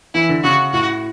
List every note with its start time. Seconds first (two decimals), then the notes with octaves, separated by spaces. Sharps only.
0.14 E3 E4
0.29 D3
0.44 C#3 F#4
0.73 A2 F#4